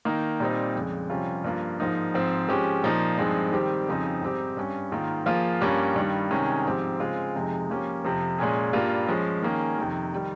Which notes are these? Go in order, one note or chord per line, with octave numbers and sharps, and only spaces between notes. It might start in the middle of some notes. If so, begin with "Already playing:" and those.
D#3 A#3 D#4
A#2 G3 C4 D#4
F2 C#3 G#3
F2 C3 G3 C#4 F4
G2 F3 A#3 F4
G#2 F3 A#3 D#4
G#2 F3 C4
F3 G#3 C#4 G4
A#2 F3 A#3 D#4
G2 F3 G#3 C4 D#4
D#3 G3 C4 G4
F2 C#3 F3 C4 D#4
G#2 G3 C4 D#4 G4
G2 G3 C#4
G#2 D#3 A#3 F4
F3 A#3 F4 G#4
G2 G3 A#3 C#4 G4
G2 D#3 G3
C3 D#3 G#3 C#4 G#4
G#2 F3 C4 G4
C#3 G#3 C4 F4
F2 C3 F3 G#3 D#4
F3 A#3 C#4 G4
F2 C3 F3
A#2 G#3 C#4 G#4
G2 G3 A#3 F4
F3 G#3 C#4
D#3 A#3 C#4 G#4
F2 C3 D#3
D#3 G3